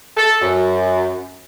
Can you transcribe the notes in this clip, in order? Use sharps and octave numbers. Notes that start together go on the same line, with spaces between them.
A4
F#2